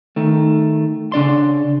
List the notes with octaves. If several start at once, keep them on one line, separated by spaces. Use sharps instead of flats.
D#3 A3
C#3 D4 D5 C6